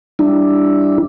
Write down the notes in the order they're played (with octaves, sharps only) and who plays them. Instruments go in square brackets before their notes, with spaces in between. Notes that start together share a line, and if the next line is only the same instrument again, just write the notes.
[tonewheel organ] G3 D4 E4